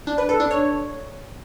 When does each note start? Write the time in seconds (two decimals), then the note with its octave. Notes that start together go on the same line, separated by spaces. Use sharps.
0.07 D4
0.18 B4
0.29 A4
0.40 D4
0.51 C#5